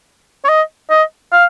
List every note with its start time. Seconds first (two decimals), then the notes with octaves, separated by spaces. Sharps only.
0.44 C#5
0.49 D#5
0.90 D#5
1.32 F5